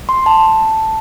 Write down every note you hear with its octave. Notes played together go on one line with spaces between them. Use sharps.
C6
A5